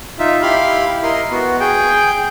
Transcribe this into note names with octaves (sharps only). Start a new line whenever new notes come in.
D#4 F4 E5
E4 G4 F5 B5 C6
E4 A#4 D#5 C6
B3 F#4
G#4 G5